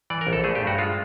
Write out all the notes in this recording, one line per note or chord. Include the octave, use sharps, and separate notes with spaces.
E3 D5
A#4
A#1
A4
A3 G#4
G4
G2
F#4
G#3 F4